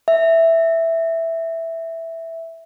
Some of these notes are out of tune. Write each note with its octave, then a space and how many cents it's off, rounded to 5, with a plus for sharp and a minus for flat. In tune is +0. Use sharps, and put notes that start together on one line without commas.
E5 +0